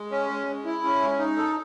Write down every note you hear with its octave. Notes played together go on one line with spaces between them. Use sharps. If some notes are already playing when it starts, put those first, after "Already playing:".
Already playing: G#3
C#4
G#3
G#3
E4
C#4
G#3
D#4
A4